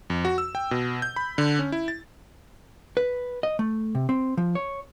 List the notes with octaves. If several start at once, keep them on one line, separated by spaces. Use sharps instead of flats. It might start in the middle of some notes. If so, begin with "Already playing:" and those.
F2
F#4
E6
G5
B2
G6
B5
D3
C#4
E4
A6
B4
D#5
A3
C3
C4
F3
C#5